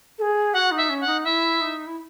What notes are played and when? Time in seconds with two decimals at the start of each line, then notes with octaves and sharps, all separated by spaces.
0.18 A4
0.21 G#4
0.53 F#4 F#5
0.71 D#4
0.77 E5
0.89 C#4
1.01 F#5
1.06 D#4
1.24 E4 E5
1.60 D#4
1.86 E4